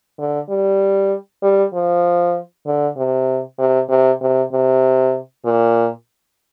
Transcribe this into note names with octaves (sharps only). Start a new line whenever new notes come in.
D3
G3
G3
F3
D3
C3
C3
C3
C3
C3
A#2